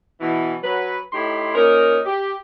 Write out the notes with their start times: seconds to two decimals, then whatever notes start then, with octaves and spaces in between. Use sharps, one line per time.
0.21 B2 E3
0.62 F#3 B4
1.13 A2 D#4 E4 G4 B5 C6
1.54 A#2 C#4 D#4 A#4
2.06 G4